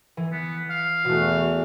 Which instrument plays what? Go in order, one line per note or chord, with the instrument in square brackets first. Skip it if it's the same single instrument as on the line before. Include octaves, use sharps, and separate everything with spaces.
[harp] E3
[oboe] B3
F5
[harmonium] E2 E3 [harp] B2 A3 [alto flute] F#4